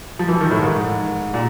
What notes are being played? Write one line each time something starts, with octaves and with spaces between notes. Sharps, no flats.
F3
E3
D#3
A2
G#2
A#2